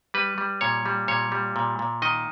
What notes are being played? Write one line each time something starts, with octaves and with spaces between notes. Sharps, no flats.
G3 B4
G3
A#2 C#5
G3
A#2 C#5
G3
A#2
A#2
D#3 D#5